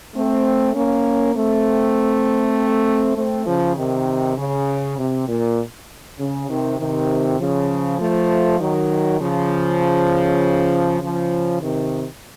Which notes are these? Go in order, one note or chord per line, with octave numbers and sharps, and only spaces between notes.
A3 C4
A#3 C#4
A3 C4
A3 C4
C#3 F3
C3 D#3
C#3
C3
A#2
C#3
C3 D#3
C3 D#3
C#3 F3
F3 A3
D#3 F#3
C#3 F3
C#3 F3
C3 D#3